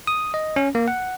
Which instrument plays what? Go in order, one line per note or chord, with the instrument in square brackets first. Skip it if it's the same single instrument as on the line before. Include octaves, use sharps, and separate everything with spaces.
[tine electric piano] D#6
D#5
C#4
A#3
F#5